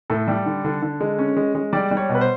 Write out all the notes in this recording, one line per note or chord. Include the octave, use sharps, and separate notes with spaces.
A2 A4
G3
D3
D3
D3
G#3
C#4
G#3
G#3
G3 D5
G3
C#5
B2
B4
C5